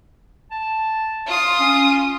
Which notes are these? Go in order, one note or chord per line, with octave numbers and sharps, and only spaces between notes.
A5
F4 D#6
C#4